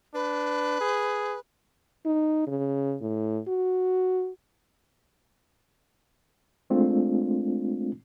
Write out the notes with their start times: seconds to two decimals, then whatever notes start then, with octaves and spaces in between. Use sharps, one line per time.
0.14 D4 B4
0.81 G#4
2.06 D#4
2.47 C#3
3.01 A2
3.48 F#4
6.70 G#3 A3 C4 D4 F4